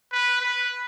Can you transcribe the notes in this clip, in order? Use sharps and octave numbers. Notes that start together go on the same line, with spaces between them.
B4
B4